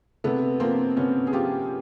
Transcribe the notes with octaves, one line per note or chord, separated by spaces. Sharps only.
C3 A3 B3
F3 A#3 C4
C3 B3 C#4
G#4
F3 F4 G4